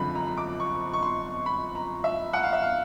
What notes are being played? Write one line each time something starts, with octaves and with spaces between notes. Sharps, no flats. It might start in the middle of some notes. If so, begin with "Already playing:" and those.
Already playing: F#1 F2 D3 F3 B5
A#5
D6
C#6
C#6
C6
B5
A#5
E5
F#5
F5
E5
F5